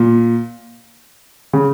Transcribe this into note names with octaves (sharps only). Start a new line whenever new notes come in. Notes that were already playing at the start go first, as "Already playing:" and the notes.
Already playing: A#2
C#3